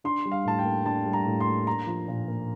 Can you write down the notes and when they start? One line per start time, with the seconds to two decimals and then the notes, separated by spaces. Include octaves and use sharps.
0.04 D4 C6
0.25 G3
0.32 F5
0.45 A2 A5
0.59 G5
0.65 A#3
0.86 D4 A5
1.06 G3
1.13 A#5
1.26 A2
1.40 C6
1.47 A#3
1.66 D4 A#5
1.87 F3
2.08 A#2
2.28 A#3